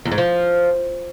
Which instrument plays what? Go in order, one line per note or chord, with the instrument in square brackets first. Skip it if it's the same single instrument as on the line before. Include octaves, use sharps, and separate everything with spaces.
[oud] E2
G#2
F3